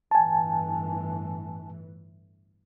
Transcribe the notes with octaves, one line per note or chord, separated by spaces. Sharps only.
G1 A2 E3 G#5 A5